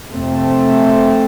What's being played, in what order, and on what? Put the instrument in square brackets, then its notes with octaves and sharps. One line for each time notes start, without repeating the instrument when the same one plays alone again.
[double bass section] F2 C3 A3 C4